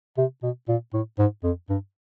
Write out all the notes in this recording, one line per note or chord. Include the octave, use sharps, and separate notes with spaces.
C3
B2
A#2
A2
G#2
F2
G2